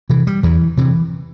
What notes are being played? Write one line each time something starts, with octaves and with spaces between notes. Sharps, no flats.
C3 E3
G3
E2 E3
C3 E3